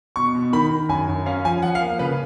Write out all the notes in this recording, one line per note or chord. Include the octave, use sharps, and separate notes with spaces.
B2 C#6
B2
D#3 B5
D#3
F#2 G#5
F#2
C#4 F5
F3 G#5
F3 F#5
F5
A#3
C#3 B4